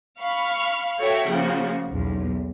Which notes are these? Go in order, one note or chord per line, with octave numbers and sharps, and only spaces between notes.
F5 B5 C#6 F6
F#4 A4 C#5 E5 F#5 G5
C#3 F3 A#3 F#4
B1 E2